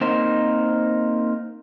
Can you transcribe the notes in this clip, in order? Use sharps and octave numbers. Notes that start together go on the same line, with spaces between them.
A#3 C4 D#4 A#4 C5